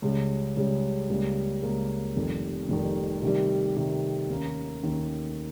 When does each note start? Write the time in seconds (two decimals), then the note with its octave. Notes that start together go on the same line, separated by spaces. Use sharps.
0.02 C#2 C#3 G3
0.56 C#2 C#3 G3
1.09 C#2 C#3 G3 A#3
1.63 C#2 C#3 G3 A#3
2.16 F1 F2 D#3 G3
2.69 F1 F2 D#3 G3
3.22 C3 D#3 G3
3.77 C3 D#3 G3
4.30 D#2 D#3 A#3 C#4
4.83 D#2 D#3 A#3 C#4